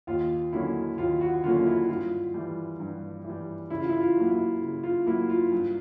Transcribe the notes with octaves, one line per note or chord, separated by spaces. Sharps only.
D#2 F4
D3 F#3 A#3 C#4 E4
D#2 F4
F#4
D3 F#3 A#3 C#4 F4
E4
G2 F4
E3 G3
G2
E3 G3
C#3 E4
F4
E4
F4
F#3 A#3
E4
C#3
F4
F#3 A#3 E4
F4
G2